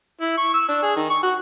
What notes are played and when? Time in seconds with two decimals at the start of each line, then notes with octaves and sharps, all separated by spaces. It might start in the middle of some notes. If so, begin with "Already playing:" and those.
0.21 E4
0.38 C#6
0.54 E6
0.69 D4
0.83 G#4
0.96 D#3
1.10 C#6
1.23 F#4